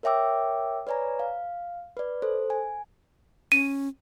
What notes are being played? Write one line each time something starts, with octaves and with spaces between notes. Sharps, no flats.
A#4 C#5 E5 G5 D6 E6
B4 C#5 D5 G#5 A#5
F5
B4 D5
A4 C5
G#5
C#4 D#7